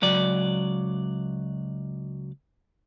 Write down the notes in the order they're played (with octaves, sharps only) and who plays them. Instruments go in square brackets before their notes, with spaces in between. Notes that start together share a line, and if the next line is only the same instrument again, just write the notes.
[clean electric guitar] C#2 F#3 D5